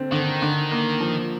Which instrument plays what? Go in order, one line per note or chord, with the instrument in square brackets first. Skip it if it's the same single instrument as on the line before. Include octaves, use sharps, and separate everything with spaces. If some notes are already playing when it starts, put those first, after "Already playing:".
Already playing: [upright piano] D3 C4
[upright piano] D3 [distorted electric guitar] D#3
[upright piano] D3
A#3
F3